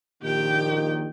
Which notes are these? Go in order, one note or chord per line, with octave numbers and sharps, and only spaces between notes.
A#1 A#2 D#3 G4 G5